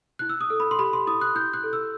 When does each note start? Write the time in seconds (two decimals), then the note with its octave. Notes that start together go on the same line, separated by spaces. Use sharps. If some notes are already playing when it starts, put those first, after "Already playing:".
0.19 E4 F#6
0.29 E6
0.41 D#6
0.50 A4
0.60 B5
0.71 C6
0.79 G4 B5
0.93 C6
1.07 E4 D#6
1.21 F#6
1.35 E4 G6
1.54 F#6
1.63 A4
1.73 E6